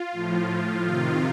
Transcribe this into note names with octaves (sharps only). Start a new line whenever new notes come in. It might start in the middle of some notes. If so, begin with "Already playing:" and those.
Already playing: F4
A2 F3
C3 D#3 F4